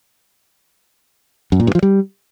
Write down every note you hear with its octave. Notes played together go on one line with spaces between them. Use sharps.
F#2
A#2
G2
F3
G3